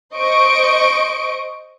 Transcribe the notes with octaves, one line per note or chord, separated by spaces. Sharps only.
C5 D#5 C#6 D7